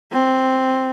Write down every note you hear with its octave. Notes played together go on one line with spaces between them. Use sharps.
C4